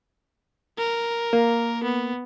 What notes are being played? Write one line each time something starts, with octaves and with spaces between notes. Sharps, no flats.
A#4
A#3
B3